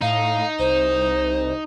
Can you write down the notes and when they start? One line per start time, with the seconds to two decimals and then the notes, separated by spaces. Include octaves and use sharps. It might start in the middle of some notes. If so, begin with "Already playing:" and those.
0.01 A2 D#4 F5
0.59 C2 C5